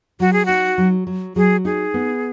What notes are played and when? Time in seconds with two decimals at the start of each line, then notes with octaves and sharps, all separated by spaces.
0.20 F#3 F#4
0.33 G#4
0.46 D#4 F#4
0.78 F#3
1.07 F#3
1.36 F#3 G#4
1.65 D#4 G#4
1.94 B3